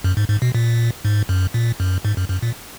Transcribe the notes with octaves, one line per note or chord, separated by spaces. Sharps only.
F#2
G#2
G#2
B2
A#2
G#2
F#2
A#2
F#2
G#2
F#2
F#2
A#2